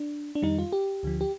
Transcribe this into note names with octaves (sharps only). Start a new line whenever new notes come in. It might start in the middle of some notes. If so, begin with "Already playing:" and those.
Already playing: D4
D4
F2 D#3 G3 D#4
F4
G4
D2 D3 F3
G4